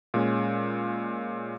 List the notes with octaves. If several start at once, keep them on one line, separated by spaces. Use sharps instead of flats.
A#2 G#3 C#4